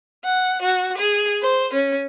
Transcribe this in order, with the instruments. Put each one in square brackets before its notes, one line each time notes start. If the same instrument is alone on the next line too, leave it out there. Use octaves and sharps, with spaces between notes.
[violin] F#5
F#4
G#4
C5
C#4